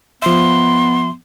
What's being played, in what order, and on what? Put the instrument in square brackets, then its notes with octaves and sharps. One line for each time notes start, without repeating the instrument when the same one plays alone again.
[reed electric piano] F3 E5 [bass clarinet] B3 [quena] C6